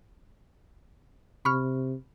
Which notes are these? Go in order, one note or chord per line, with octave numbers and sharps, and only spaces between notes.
C3 B5 C#6 F6